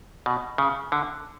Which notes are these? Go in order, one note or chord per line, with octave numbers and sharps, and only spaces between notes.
B2
C#3
D3